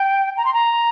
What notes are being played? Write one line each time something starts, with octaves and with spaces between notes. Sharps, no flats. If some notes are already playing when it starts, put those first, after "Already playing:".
Already playing: G5
A#5
C6
A#5